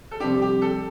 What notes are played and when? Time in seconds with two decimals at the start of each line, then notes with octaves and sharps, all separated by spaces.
0.11 A4
0.20 F2 C3 G3 D4 G4
0.42 G4
0.62 A4